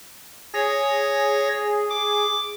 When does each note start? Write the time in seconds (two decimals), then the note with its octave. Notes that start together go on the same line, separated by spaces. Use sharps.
0.54 G#4 C#5 A#6
1.90 D6